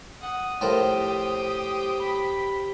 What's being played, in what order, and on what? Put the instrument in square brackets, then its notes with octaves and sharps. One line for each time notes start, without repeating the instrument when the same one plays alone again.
[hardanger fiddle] F#5 [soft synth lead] D#6
[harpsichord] A2 F3 A#4 [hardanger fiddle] G4 C5
[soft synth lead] B5